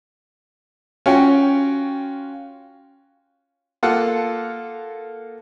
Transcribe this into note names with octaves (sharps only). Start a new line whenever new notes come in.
C#4 F4 F#4 G5
A#3 F4 A4 F#5